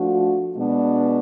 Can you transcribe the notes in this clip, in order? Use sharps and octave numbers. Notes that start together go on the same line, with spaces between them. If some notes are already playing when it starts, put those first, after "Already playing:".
Already playing: F3 A3 D4 F#4
B2 G#3 B3 D4